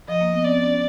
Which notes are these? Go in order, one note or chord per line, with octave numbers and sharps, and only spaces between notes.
F3 D#5
A#3
B3
C4 D5
C#4